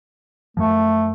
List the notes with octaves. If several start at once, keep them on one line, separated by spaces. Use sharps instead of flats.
F#2 F3 A3